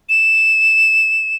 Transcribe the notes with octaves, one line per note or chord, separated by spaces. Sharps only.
E7